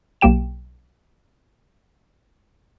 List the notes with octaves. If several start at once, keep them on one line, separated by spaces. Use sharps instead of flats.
B1 A#3 G4 G5 E7